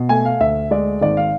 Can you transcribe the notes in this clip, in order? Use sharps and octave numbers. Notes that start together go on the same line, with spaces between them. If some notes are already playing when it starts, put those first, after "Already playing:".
Already playing: B2
A3 G#5
F5
D2 E5
G#3 D5
G#1 D5
F5